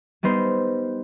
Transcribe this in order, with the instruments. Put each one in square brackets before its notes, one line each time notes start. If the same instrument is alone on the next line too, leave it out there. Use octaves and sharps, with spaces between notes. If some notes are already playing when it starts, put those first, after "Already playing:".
[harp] G3 B3 D#4 C5